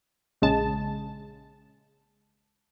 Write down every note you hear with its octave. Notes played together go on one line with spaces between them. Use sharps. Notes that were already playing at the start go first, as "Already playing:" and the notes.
A#1 C#3 G#3 A5